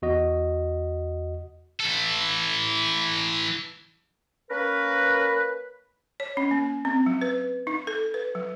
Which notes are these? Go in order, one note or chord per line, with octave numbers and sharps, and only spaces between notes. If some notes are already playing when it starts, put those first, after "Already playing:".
E2 F#4 D#5
E3 A4
A#3 C#4 A#4 B4
C#5
C#4
A#3
C4
F#3
B4
D#4
A4
B4
F#3